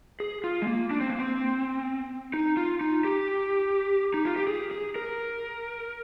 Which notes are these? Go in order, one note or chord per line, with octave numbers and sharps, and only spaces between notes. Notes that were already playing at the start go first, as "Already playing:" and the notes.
G#4
F4
G#3
A#3
D4
C4
A#3
C4
D#4
F4
D#4
G4
D#4
F4
G4
G#4
G#4
A#4